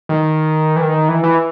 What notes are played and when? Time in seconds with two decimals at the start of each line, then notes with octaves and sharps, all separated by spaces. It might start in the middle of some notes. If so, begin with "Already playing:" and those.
0.09 D#3
0.76 E3
0.81 D#3
1.09 E3
1.23 E3